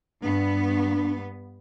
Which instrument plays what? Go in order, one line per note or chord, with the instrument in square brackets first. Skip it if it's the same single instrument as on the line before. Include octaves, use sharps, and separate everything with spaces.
[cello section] G2 B3 [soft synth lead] D4